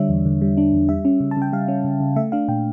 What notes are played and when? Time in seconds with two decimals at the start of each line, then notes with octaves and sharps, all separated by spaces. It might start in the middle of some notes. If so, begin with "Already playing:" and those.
Already playing: D3 G3 D4 C#5 E5
0.09 E2
0.25 D3
0.41 G3
0.57 D4
0.73 E2
0.89 G3 E5
1.05 C#4
1.20 C#3
1.31 A5
1.37 C#3 G5
1.52 G3 F5
1.68 C#4
1.84 C#3
2.00 C#3
2.16 A3 E5
2.32 D4 F5
2.48 A#2 G5